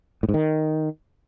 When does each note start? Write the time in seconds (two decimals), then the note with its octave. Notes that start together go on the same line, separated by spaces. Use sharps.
0.23 A2
0.29 G#2
0.34 D#3